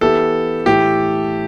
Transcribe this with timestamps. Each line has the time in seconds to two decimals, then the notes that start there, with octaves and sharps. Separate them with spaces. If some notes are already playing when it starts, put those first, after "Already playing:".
0.01 E3 B3 G4 A4 E5
0.66 A2 E3 A3 G4